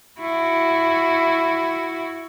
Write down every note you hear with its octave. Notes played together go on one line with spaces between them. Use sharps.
E4 F#4